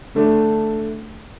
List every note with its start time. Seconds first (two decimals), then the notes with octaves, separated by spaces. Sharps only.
0.15 D3 A3 D4